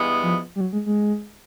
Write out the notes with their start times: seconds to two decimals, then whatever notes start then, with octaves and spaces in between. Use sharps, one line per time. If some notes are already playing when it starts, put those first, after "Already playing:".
Already playing: G2 E3 G#3 B3
0.23 F3
0.56 G3
0.61 F#3
0.73 G#3
0.86 G#3